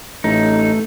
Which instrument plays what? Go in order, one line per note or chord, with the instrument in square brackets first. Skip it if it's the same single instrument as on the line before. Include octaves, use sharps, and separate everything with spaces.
[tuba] A1 [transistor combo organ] A3 [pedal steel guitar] D#4